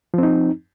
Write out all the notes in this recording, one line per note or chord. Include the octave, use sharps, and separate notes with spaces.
F3 C4 D#4